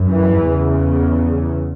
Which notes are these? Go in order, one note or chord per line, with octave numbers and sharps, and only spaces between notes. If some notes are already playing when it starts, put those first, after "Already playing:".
Already playing: F#2
E3
E2 C#3